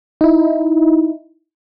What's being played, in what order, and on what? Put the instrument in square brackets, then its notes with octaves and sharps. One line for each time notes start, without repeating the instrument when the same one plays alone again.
[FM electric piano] D#4 E4